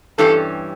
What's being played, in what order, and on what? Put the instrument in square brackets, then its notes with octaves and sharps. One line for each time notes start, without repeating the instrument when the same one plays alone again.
[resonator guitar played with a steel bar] G2 E3 G3 C#4 [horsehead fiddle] A4